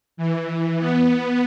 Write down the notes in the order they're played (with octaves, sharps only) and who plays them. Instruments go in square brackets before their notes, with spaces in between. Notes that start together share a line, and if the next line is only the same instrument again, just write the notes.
[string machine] E3
B3